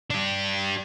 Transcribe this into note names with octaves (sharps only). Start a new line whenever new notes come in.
D4 G4